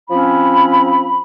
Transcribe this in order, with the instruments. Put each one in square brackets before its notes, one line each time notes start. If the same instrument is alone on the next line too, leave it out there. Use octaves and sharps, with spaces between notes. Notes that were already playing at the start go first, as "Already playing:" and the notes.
[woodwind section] F3 C4 C#4 B5